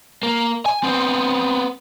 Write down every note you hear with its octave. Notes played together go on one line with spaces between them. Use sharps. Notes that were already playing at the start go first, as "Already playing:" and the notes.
A#3
G#5
B3 C4